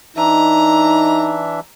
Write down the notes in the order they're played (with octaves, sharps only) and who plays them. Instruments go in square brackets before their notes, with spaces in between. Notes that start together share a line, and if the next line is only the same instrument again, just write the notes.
[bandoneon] E3 D4 E5 [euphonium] D#4 [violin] A#5